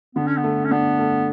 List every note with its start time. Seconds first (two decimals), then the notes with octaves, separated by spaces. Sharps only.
0.15 D3 B3
0.27 C#4
0.37 B3
0.44 A3
0.65 C#4
0.71 B3 D4
0.99 A3